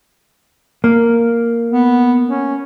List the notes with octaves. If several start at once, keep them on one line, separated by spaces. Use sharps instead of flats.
A#3
B3
C#4